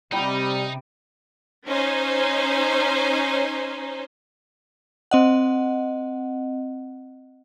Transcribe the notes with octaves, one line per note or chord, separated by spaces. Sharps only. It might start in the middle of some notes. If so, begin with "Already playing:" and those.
C3 G3 D#4 G5 B5
C#4 D#4 C5
C4 D#5 F#5